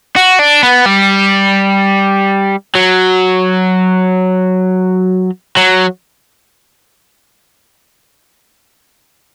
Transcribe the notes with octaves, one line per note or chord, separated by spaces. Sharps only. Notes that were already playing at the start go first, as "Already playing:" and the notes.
F#4
D4
B3
G3
F#3
F#3